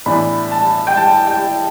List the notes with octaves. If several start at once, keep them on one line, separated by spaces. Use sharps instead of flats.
A2 E3 B3 D4 B5
A5
G5
A5
G5